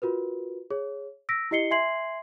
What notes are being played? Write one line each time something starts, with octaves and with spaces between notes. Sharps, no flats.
F4 F#4 A#4 B4
G#4 C#5
E6 A#6 B6 D7
E4 G4 D#5 C7 C#7 G7
E5 G#5 C6 G#6 C7 F#7